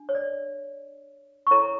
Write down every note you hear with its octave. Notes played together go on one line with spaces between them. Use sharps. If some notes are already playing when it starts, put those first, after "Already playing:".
Already playing: D4
C#5
D5
C#6
E4 A4 C#5 A#5